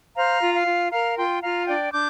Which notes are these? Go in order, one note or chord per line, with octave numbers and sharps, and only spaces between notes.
C5 F5 A#5
F4
F5
F4
A#4 F5 A#5
F4 G5 C6
F4 F5 A#5
D4 D5 G5
D4 D6 G6